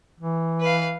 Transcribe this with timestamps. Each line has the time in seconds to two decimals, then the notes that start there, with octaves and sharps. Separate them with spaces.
0.20 E3
0.61 B4 F5